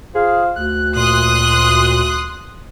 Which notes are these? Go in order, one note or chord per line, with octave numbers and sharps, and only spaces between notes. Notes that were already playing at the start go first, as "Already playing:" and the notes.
F4 G#4 C5 F5
D2 F#6
A#2 C6 D#6 F#6